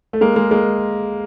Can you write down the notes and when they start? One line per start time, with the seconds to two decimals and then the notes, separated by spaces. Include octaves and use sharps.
0.13 A3
0.21 G#3 A#3
0.36 G#3 A#3
0.51 G#3 A#3